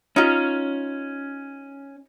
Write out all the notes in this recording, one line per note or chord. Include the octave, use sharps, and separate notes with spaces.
C#4 D#4 F4